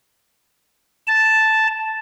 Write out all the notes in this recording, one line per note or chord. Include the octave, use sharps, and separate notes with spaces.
A5